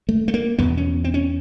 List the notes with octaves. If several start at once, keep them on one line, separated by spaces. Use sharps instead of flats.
A3
A3
A#3
E2 B2 B3
C#4
C4
C#4